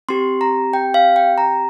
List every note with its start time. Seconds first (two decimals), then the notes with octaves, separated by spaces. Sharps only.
0.09 C4 G4 C6
0.41 A#5
0.73 G5
0.94 F5
1.16 G5
1.38 A#5